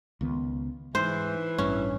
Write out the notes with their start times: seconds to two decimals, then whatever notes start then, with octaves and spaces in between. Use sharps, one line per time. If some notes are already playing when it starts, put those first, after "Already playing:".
0.21 C#2 D#3 B3
0.95 G#2 E3 C5
1.58 A1 G2 C#4